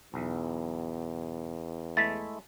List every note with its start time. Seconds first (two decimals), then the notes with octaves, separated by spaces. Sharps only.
0.14 B1 E2
1.97 G#3 A3 E4 A6 B6